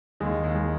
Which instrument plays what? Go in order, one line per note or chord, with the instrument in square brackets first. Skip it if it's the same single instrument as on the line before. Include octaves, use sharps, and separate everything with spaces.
[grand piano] D#2 [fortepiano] G#3
[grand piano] D#2
[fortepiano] G#3